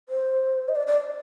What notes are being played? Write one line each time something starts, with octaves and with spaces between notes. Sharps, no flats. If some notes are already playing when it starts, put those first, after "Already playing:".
C5
D#5
D5
D5